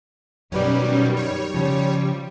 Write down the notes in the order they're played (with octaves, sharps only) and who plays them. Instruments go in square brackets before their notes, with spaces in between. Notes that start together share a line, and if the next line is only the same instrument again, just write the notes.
[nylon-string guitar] F#2 B4 D5 [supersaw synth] B2 C#4 [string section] D#3 G3
[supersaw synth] C#5
[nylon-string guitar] C#3 F3 [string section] G3